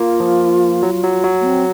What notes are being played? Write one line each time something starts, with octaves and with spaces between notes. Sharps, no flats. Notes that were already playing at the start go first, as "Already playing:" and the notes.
Already playing: A#3 F4
F3
F#3
F#3
F#3
A#3
C4